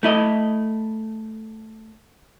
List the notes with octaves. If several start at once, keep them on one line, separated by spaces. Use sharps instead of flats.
A3 E4 D#5